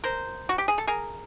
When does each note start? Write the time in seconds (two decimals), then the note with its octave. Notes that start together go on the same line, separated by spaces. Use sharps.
0.04 A#4 C5
0.49 F#4
0.58 G4
0.68 G#4
0.78 A4
0.87 G#4 A#4